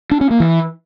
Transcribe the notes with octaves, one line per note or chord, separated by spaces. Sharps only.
D4
C#4
A#3
E3